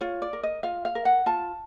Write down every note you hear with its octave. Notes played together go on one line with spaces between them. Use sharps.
F4 C#5
D5
A#4
D#5
F4 F5
F5
A#4
F#5
F4 A5